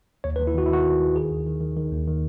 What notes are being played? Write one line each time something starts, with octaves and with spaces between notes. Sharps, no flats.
D#2 C#5
B4
D#2
E4
D#3 F#4
E4
D#3 F#4
D#3
D#3
D#3 G#4
D#2
D#3
D#3
D#3
D#2
D#3